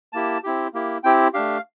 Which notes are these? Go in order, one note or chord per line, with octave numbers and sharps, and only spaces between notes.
A#3 E4 G4 A5
C4 E4 G4
A#3 E4 G4
C4 E4 G4 G5
A3 D4 G4 F5